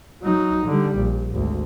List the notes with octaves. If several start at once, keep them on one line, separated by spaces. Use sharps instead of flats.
F#3 D#4
D3 G3
A#1
G#1 D2